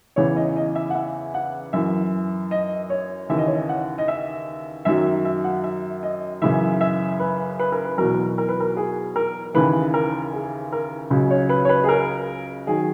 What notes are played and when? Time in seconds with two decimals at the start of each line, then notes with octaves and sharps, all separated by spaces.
0.16 E2 C#3 E3 C#5
0.36 D#5
0.56 D#5
0.75 E5
0.90 F#5
0.95 E5
1.34 F#5
1.73 F#2 E3 E5
2.51 D#5
2.90 C#5
3.29 D#2 C#3 E3 E5
3.38 D#5
3.47 C#5
3.55 D#5
3.69 F#5
3.98 D#5
4.08 E5
4.85 F#2 D#3 F#3 E5
5.25 E5
5.44 F#5
5.64 E5
6.03 D#5
6.42 F#2 C#3 E3 E5
6.81 E5
7.20 B4
7.59 B4
7.72 A#4
7.84 B4
7.98 E2 B2 F#3 A#4
8.38 A#4
8.49 B4
8.60 A#4
8.77 G#4
9.16 A#4
9.54 D#2 C#3 E3 B4
9.94 A#4
10.33 G#4
10.72 A#4
11.10 C#2 C#3 F#3
11.30 C#5
11.49 B4
11.65 C#5
11.69 B4
11.84 G#4
11.88 A#4
12.67 D#3 F#3 G#4